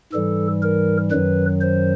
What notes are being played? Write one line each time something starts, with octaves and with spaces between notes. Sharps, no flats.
G#2 E3 G3 A4
A#4
F#2 D#3 F#3 B4
C5